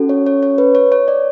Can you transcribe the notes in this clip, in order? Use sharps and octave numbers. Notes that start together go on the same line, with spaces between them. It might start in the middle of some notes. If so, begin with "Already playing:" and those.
Already playing: C#4 F#4 A4
C#5
C#5
C#5
B4
C#5
C#5
D5